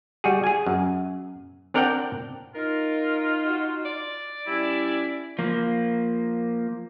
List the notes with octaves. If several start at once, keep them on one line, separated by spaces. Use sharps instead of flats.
G3 F#4 G#4
G#4 G#5
F#2
C4 D4 A#4 D5 F#5 G5
D#4 F4 A#4
F#4
D5
G3 C#4 E4
F3 A#3